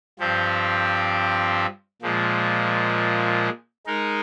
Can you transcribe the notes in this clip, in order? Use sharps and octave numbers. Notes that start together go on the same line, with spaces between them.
G2 F3 C4 G4
A#2 F3 G#3
G#3 D#4 A#4